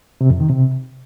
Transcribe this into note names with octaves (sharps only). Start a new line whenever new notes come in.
C3
F2
D#3
C3